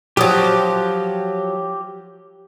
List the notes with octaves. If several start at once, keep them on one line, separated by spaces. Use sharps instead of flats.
F3 F#3 G4 D#6